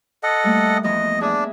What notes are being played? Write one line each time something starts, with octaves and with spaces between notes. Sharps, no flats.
A4 D#5 F#5
G3 A3 A#3
E2 F3 B3 D#5
D4 G#4 D#5 E5